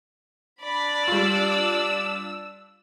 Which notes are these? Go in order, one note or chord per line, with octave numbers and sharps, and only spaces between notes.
D4 D5 B5
G3 F4 E6